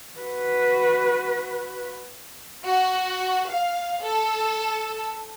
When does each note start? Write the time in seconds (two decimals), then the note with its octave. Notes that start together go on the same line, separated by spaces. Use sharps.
0.18 F#4 B4
2.65 F#4
3.51 F5
4.04 A4